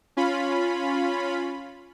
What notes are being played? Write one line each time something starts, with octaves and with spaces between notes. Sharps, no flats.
C#4 F4 B5